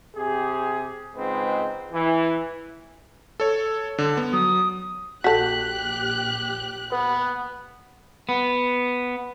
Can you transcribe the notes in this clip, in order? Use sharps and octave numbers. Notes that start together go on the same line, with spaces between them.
C3 G4 G#4
C#2 G#2 G#3 C4 B4
E3
A4 C#5
D3
B3
F#3 D#6
A#1 F#4 G4 A4 F#6 G6 B6
B3 B4
B3